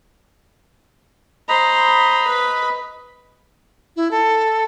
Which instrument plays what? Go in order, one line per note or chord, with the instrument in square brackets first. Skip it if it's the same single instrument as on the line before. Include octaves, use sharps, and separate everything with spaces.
[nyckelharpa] C5 A#5 [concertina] D#5 B5
[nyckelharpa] B4
[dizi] E4
A4